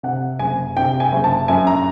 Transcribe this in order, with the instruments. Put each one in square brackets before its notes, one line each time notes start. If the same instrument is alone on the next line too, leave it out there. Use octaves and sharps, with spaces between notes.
[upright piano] C3 F#5
F#1 G#5
C3 G5
G#5
F#1
A5
F#2 G#5
A#5